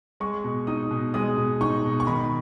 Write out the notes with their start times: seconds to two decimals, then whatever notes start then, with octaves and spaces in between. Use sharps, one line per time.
0.20 G#3 C#6
0.44 B2
0.67 D#4 D#6
0.91 B2
1.14 G#3 D#6
1.37 B2
1.61 D#4 C#6
1.84 B2
2.00 C#6
2.07 D#3 B5